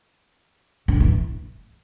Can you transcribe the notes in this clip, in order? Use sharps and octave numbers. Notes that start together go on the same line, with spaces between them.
D3
E3